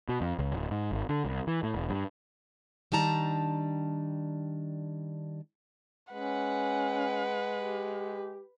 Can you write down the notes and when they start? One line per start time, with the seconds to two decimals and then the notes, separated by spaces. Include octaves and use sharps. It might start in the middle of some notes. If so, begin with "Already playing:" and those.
0.09 B2
0.21 F2
0.39 C#2
0.53 D1
0.71 G#2
0.92 G#1
1.09 D3
1.25 C2
1.47 E3
1.63 A2
1.75 E1
1.90 G2
2.92 D#3 G3 D4 A5 A#5
6.13 G#3 C#4 B4 F#5
7.55 G4